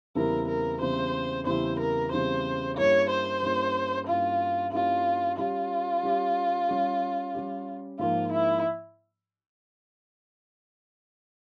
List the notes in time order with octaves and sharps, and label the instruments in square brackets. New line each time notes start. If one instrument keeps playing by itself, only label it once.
[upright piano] E2 C#3 G3 C4 E4 [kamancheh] A#4
[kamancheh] A#4
[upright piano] E2 C#3 G3 C4 E4 [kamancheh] C5
[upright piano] E2 C#3 G3 C4 E4 [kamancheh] C5
[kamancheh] A#4
[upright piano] E2 C#3 G3 C4 E4 [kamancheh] C5
[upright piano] G2 G3 A#3 C#4 E4 [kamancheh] C#5
[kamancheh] C5
[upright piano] G2 G3 A#3 C#4 E4
[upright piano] G2 G3 A#3 C#4 E4 [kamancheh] F4
[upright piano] G2 G3 A#3 C#4 E4 [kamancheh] F4
[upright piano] G3 C#4 G4 [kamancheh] F4
[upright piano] G3 C#4 G4
G3 C#4 G4
G3 C#4 G4
[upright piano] G#2 F3 A#3 [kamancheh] F4
[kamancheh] E4